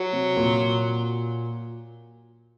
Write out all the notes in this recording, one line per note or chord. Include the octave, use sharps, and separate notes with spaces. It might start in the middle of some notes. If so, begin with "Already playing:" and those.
Already playing: F#3
C3
A#2